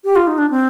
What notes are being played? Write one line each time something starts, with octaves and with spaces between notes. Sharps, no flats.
G4
F4
D#4
D4
C4